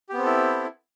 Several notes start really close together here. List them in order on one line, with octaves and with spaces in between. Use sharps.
G4 B3 C4 A4 E4